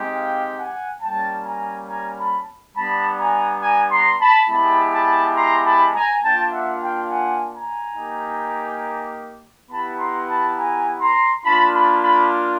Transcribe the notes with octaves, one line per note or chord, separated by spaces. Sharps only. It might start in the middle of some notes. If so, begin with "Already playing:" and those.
Already playing: G#3 C4 D#4 G4
F5 G5
F#5 G#5
G3 A#3 C#4 G5 A5
G#5 A#5
G#5 A#5
A5 B5
G3 B3 D4 A5 B5
G#5 A#5
G#5 A#5
A#5 C6
A5 B5
G#3 B3 E4 G4 A5 B5
A5 B5
A#5 C6
A5 B5
G#5 A#5
A#3 D4 F4 G5 A5
E5 F#5
F5 G5
F#5 G#5
G#5 A#5
A#3 D#4 G4
B3 E4 G4 A5 B5
A#5 C6
A5 B5
G#5 A#5
A#5 C6
A#3 D4 F4 A5 B5
A5 B5
A5 B5